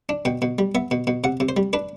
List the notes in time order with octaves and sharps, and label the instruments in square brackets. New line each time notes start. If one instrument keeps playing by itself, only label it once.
[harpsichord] D4
B2 G5
B2
G3
B3 E5
B2
B2
C3 F#5
C3
C5
G3
D4 B4